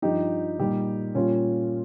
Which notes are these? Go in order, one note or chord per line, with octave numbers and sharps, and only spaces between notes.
G2 F3 D#4 G4
A#2 G3 D#4 G4
A#2 G3 C#4 F4